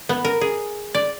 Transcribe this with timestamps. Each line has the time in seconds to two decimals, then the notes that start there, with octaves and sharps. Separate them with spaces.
0.09 B3
0.25 A#4
0.41 G#4
0.95 D5